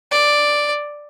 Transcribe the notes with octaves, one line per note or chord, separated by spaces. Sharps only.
D5